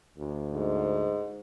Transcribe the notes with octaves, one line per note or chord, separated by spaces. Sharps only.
D2
G#2